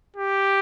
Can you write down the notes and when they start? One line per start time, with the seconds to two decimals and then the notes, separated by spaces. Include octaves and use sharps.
0.16 G4